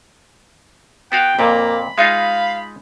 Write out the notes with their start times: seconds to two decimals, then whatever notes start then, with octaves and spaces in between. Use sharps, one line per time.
1.12 B3 F#4 F5 G5
1.39 F2 A#2 A#3 B5
1.98 G#3 D#4 F4 F5